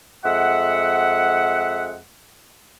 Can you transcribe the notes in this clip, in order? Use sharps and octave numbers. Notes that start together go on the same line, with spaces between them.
F2 G#3 E5 F#5